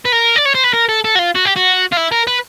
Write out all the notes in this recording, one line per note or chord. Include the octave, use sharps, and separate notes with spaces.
B4
A#4
D5
C#5
C5
B4
A#4
A4
A4
F#4
F4
F#4
G4
F#4
F4
E4
A#4
B4